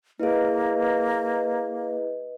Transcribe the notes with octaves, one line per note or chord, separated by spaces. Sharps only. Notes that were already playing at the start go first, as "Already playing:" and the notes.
A#3 E4 G#4 B4 D#5